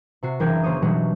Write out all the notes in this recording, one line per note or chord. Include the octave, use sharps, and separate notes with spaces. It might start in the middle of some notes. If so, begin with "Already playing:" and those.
C3 F#4 C7
F#1 E3 D4 A#4 G5 G#6
C#3 A#3 C5 C#5 D#6
B2 E3 F#3 G3 D4 D#4